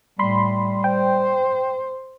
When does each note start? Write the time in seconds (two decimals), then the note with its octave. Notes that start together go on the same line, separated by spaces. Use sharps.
0.19 A2 G3 B5 C6
0.84 C5 G5